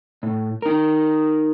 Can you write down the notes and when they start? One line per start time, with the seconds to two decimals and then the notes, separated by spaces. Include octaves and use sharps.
0.23 A2
0.62 D#4 A#4